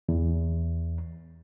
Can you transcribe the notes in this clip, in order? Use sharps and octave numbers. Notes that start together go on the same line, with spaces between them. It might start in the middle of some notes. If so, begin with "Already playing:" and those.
E2